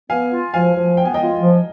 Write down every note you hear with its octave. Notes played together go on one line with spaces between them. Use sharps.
B3 F5 G#5
F4
F3 F5 G#5
F3
B3 G5
G#5
D#5 G5
F4
F3